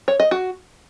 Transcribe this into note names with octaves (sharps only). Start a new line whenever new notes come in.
C#5
D#5
F#4